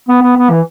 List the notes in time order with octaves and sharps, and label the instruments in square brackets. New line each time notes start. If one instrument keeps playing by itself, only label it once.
[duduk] B3
B3
B3
E3